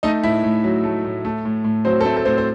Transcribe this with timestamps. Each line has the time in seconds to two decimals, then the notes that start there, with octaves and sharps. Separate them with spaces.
0.03 A3 D#4 D#5
0.23 A2 E4 E5
0.43 A2
0.64 F#3
0.84 A3
1.05 A2
1.25 A3
1.45 A2
1.64 A2
1.85 F#3 C4 C5
2.01 A4
2.05 A3 C4 C5
2.17 A4
2.25 A2 C4 C5
2.38 C5